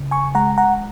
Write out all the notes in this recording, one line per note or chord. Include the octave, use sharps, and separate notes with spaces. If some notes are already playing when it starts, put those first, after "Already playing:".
Already playing: C#3
G#5 C#6
G#3 F#5 A#5
F#5 A#5